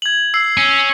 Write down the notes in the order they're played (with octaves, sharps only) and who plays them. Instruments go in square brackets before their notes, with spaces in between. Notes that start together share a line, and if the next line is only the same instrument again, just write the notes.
[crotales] G#6 F#7
E6 C7
[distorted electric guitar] C#4